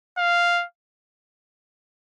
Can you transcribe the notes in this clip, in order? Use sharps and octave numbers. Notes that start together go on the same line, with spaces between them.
F5